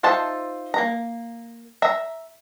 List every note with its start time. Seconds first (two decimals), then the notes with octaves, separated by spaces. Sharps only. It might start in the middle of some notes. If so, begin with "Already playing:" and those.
0.03 D#4 F4 C5 E5 A5
0.74 A#3 A#5
1.82 E5 A#5